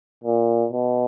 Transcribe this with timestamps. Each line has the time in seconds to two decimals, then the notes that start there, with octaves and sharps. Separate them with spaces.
0.24 A#2
0.72 B2